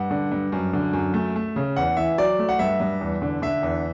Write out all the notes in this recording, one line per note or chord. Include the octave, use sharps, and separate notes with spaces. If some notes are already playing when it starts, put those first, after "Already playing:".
Already playing: G2 F#5
D3
G2
F#2
D3
F#2
A3
A3
C#3
E2 F#5
E3 E5
F#3 D5
A3
F#5
G2 E5
G2
E2
D3
D3 E5
E2